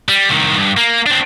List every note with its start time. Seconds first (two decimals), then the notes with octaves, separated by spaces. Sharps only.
0.09 G3
0.30 C2 D#3
0.56 G2
0.77 A#3
1.06 C4 D4